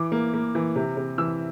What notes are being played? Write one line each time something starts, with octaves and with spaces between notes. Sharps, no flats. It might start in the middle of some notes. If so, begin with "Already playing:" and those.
Already playing: E3 D6
A#3
A#3
E3
C3
C3
E3 E6